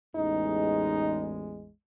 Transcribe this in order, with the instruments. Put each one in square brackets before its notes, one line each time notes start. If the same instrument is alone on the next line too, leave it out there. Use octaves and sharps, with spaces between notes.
[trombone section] A1 E2 G#3 [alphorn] D#4